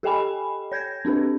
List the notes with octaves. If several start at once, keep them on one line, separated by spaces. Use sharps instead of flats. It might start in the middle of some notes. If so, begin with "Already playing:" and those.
G4 A4 D#5 G5 G#5 B5
C#5 G6 G#6 A#6
C4 D4 G4 A4 B4